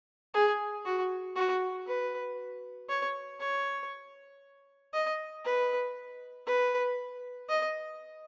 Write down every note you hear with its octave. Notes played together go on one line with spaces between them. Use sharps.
G#4
F#4
F#4
B4
C#5
C#5
D#5
B4
B4
D#5